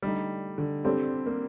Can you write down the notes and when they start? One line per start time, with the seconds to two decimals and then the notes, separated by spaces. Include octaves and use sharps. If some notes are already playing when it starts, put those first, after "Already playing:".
0.03 D3 G3 A3 D#4
0.58 D3
0.85 G3 C4 D4 A4 C5
1.26 A#3